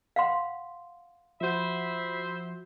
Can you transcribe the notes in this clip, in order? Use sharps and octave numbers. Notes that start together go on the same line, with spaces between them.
F5 F#5 C6
F3 F#4 C5 E5 B5